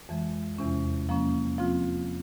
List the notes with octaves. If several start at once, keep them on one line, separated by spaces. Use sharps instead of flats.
F2 E3 G#3
E2 C3 E3 G#3 C#4
F3 A#3 C#4
F3 C4 F4